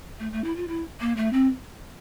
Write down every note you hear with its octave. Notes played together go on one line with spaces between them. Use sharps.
A3
A3
E4
F4
E4
A#3
A3
C4